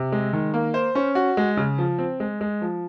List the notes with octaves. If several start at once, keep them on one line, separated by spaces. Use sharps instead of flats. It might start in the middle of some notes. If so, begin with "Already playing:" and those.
Already playing: C3
G#3
D#3
A#3
C5
C#4
F#4
G#3
C#3
F3
C4
G#3
G#3
F3